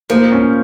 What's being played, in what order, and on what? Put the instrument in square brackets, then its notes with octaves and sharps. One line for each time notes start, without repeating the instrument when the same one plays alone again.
[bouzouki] F3 [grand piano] A#3
[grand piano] C#4